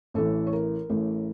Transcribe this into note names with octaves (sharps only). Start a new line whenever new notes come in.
A1 A2 E3 A4
C#5
A#4
A1 A2 E3